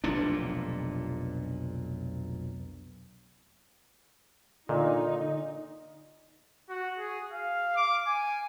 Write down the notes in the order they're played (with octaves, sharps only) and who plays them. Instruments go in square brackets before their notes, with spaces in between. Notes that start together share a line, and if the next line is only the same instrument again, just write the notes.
[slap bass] F1 B1 A#2 D4
[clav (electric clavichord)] A#2 [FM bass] D3 [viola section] D#4 [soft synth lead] D#5
[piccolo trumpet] F#4
G#4
F5
D6
G#5